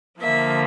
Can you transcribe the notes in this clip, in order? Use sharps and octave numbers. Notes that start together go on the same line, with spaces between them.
D3 F3 A#3 E5